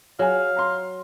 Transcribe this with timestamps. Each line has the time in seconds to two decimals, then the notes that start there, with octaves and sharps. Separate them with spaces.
0.19 F#3 G#4 F5 G#5
0.56 A#5 C6